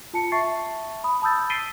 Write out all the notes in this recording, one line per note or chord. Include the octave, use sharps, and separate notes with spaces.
F4 A5 C#7
E5 A5 C#6 A6 C7
B5 D#6
A5 B5 D#6 E6 G6 A6
A6 B6 C7 D7 D#7 G7